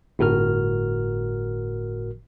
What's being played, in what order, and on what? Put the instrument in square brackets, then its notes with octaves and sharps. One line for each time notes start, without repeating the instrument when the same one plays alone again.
[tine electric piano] G1 A2 F#4 A#4 F6